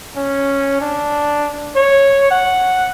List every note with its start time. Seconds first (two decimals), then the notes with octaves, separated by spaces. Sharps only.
0.16 C#4
0.81 D4
1.75 C#5
2.31 F#5